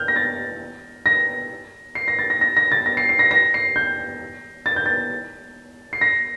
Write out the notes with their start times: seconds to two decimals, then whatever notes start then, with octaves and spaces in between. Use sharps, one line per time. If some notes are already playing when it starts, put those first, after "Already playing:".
Already playing: F6 G6
0.08 A#6
0.16 A6
1.06 A#6
1.95 C7
2.08 A#6
2.19 A6
2.30 A#6
2.41 A#6
2.57 A#6
2.72 A6
2.86 A#6
2.97 C7
3.09 C7
3.19 A#6
3.31 A#6
3.54 C7
3.76 G6
4.66 A6
4.76 G6
4.86 A6
5.93 C7
6.01 A#6